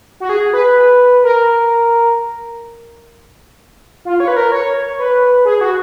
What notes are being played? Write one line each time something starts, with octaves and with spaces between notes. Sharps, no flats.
F#4
G#4
B4
A#4
F4
C#5
B4
A#4
C#5
B4
G#4
F#4